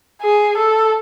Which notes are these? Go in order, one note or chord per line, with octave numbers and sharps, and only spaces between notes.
G#4
A4